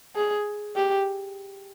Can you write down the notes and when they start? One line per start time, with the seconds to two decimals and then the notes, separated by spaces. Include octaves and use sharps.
0.16 G#4
0.76 G4